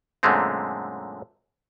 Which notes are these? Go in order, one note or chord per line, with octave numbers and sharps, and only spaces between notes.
F#2 A#2 D3 G#3 A3 C4